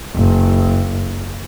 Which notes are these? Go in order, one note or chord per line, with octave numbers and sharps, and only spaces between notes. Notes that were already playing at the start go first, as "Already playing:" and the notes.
F#1